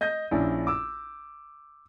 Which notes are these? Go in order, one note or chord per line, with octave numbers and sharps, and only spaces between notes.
D#5 G6 A#6
A#1 C#4 D4 E4
D6 E6